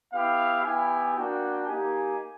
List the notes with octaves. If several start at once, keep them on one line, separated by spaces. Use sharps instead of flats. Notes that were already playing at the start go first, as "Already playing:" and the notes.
B3 E4 G4 F5
B3 E4 G4 G#5
A#3 D4 F#4 G5
A#3 D#4 G4 G#5